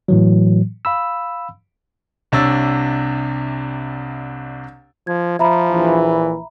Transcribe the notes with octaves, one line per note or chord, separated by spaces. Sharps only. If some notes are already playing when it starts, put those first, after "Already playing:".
A2 E3 F#3
F5 B5 E6
C2 C3 D4 C#5 E6 A6
F3 G#6
F3 E5 A#5 B5
A#1 E3